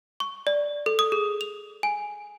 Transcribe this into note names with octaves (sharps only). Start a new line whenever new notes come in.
C#6
D5
A4
D#6
G#4
F7
G#5